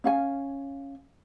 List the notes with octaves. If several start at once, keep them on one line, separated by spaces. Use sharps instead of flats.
C#4 F5 G#5